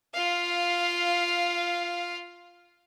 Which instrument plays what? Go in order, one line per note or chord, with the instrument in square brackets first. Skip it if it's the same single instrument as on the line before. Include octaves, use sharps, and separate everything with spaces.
[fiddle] F4 F5